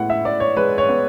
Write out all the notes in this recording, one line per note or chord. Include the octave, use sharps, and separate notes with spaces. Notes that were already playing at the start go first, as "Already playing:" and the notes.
Already playing: A2 G#3 B3 F#5
E5
A2 D5
C#5
G#3 B4
C#5
B3